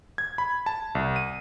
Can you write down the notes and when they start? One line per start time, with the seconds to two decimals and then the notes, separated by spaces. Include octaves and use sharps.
0.18 G#6
0.38 B5
0.66 A5
0.95 C2
1.16 D#7